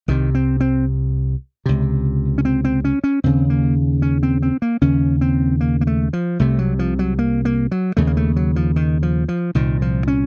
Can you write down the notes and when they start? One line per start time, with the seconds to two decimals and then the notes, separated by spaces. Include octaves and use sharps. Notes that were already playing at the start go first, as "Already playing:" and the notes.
0.08 C2 C3 D#3
0.35 C4
0.60 C4
1.66 C#2 C3
2.38 C#4
2.45 C4
2.65 C4
2.85 C#4
3.04 C#4
3.24 D#2 C#3 C4
3.50 A#3
4.02 C#4
4.23 C4
4.42 C4
4.62 A#3
4.81 D#2 C#3 C#4
5.21 C4
5.61 A#3
5.81 A#3
5.87 A3
6.13 F3
6.39 C2 C3 A3
6.59 F#3
6.79 F3
6.99 F#3
7.19 A#3
7.45 A#3
7.71 F#3
7.97 D#2 C#3 A3
8.07 A#3
8.17 A3
8.36 F#3
8.56 F3
8.76 D#3
9.03 F3
9.28 F3
9.55 C2 A#2 D#3
9.82 F3
10.08 C#4